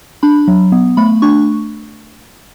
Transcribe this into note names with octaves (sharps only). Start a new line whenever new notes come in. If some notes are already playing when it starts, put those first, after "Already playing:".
D4 B5
F#3
B3
A3 B5
D4 C#6